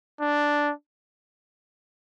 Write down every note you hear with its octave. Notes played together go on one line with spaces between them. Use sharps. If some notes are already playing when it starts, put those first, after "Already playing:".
D4